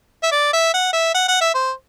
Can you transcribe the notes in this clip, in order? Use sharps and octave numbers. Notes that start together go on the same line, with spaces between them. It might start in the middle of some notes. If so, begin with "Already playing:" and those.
E5
D5
E5
F#5
E5
F#5
F#5
E5
C5